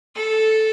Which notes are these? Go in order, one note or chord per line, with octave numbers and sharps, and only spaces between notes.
A4